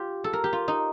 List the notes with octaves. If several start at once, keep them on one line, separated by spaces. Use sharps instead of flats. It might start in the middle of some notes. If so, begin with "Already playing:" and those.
Already playing: F4 G4
A4
A#4
G4
F4
D#4